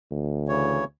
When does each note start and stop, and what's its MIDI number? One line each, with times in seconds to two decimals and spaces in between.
0.11 0.80 38
0.48 0.84 49
0.48 0.84 52
0.48 0.84 73